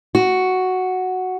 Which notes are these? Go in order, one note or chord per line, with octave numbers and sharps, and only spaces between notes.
F#4